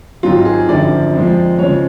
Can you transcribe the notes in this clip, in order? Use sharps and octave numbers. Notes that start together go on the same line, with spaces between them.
G#1 G#2 F#3 F4
G#4
G#1 F#2 D3 F3 D5
F2 F3 G#3
C#3 F3 G#3 C#5